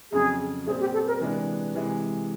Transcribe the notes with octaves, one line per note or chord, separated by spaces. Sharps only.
F2 C#3 F#3 G#4
A#2 G3 C4 G#4
G4
A4
A#4
C3 E3 G#3 B3 D4
C3 E3 G#3